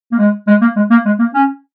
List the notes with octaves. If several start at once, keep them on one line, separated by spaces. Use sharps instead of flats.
A#3
G#3
G#3
A#3
G#3
A#3
G#3
A#3
C#4